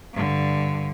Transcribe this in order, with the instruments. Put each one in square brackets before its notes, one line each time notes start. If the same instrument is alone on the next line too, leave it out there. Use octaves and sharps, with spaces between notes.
[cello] G2 D3